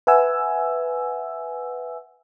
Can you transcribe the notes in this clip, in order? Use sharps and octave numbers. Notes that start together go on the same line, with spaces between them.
B4 E5 F#5 G#5 E6